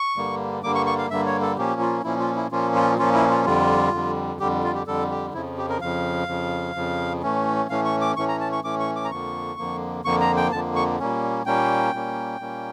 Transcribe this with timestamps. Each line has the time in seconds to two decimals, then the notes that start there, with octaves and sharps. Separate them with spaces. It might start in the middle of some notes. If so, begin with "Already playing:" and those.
Already playing: C#6
0.16 G2 D3 G3 A#3
0.63 G2 D3 G3 A#3 D6
0.75 C#6
0.86 C#6
0.98 F5
1.09 G2 D3 G3 A#3 E5
1.26 C#5
1.42 A4
1.57 A#2 F3 A#3 C#4 G4
1.81 F4
2.04 A#2 F3 A#3 C#4 E4
2.20 F4
2.36 E4
2.51 A#2 F3 A#3 C#4 F4
2.75 F4
2.98 A#2 F3 A#3 C#4 F4
3.14 E4
3.30 F4
3.45 F2 D3 G3 F4
3.93 F2 D3 G3
4.40 F2 D3 G3 G4
4.64 F4
4.74 G4
4.87 F2 D3 G3 A4
5.10 G4
5.34 F2 C#3 F3 E4
5.58 G4
5.69 A#4
5.81 F2 C#3 F3 F5
6.28 F2 C#3 F3
6.75 F2 C#3 F3
7.22 A2 E3 A3 C#4
7.70 A2 E3 A3 C#4 F5
7.85 C#6
8.01 D6
8.16 A2 E3 A3 C#4 C#6
8.28 A#5
8.40 A5
8.52 C#6
8.64 A2 E3 A3 C#4 D6
8.80 C#6
8.95 D6
9.05 A#5
9.11 F2 D3 F3 A#3 C#6
9.58 F2 D3 F3 A#3
10.05 F2 D3 F3 A#3 C#6
10.21 A#5
10.37 G5
10.52 F2 D3 F3 A#3 A5
10.76 C#6
10.99 A#2 G3 A#3 C#4
11.46 A#2 G3 A#3 C#4 G5
11.93 A#2 G3 A#3 C#4
12.40 A#2 G3 A#3 C#4